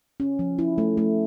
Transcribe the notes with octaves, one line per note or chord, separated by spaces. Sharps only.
C#4
F3
E4
A3
A3